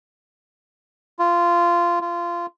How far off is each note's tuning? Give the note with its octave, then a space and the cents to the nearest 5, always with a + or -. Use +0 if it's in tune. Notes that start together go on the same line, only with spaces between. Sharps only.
F4 -15
F4 -20